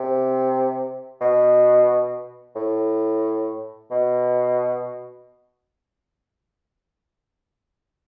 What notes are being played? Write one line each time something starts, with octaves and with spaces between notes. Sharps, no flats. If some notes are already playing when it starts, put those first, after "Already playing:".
Already playing: C3
B2
A2
B2